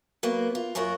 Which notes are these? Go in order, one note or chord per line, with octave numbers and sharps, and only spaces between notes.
F#3 A#3 B3
F4
F#2 F#3 F4 F#4 A#4